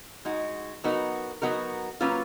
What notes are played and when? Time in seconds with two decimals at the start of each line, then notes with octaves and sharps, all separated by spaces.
0.25 G#3 D#4 F#4
0.84 F#3 B3 D#4 F#4 A#4
1.42 F#3 B3 D#4 F#4 A#4
2.00 F#3 A#3 C#4 F4 B4